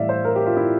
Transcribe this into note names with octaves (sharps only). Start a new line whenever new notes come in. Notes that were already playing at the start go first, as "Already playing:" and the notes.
Already playing: A2 E3 G3 D5 E5 F5
C5
A#4
G4
F4
E4